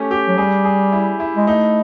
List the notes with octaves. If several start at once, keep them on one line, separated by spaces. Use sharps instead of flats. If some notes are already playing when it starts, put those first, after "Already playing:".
Already playing: A3 C#4 G4
G4
F#3
G3 G#4
G#4
E4
E4
G#3
A3 D#4